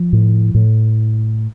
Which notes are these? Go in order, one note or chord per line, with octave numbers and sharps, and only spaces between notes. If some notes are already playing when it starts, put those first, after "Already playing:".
Already playing: F3
A2
A2